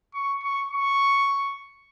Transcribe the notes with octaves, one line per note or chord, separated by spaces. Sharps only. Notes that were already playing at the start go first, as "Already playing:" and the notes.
C#6
C#6
C#6